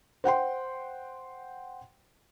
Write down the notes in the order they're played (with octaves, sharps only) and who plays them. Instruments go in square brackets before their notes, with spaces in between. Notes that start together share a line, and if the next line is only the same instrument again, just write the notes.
[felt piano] C5 F#5 G5 C6